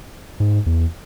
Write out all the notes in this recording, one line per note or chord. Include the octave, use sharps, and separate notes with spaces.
G#2
E2